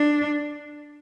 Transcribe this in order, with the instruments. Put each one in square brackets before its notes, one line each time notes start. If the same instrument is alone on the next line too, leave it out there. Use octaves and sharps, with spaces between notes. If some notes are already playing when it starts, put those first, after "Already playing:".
Already playing: [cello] D4